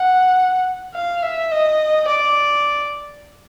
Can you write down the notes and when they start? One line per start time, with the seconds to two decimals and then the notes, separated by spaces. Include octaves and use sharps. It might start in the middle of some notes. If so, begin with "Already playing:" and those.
Already playing: F#5
0.95 F5
1.23 E5
1.52 D#5
2.08 D5